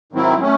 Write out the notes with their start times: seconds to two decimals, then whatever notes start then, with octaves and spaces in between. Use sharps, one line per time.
0.12 G#2 D#3 F#3 C4 E4
0.41 A3 C#4